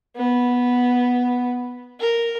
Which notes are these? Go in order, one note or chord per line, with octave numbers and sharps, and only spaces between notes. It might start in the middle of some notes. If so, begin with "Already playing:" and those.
B3
A#4